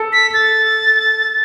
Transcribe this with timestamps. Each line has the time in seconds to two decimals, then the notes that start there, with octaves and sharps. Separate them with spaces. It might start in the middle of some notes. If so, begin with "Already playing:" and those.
Already playing: A4
0.13 B6
0.34 A6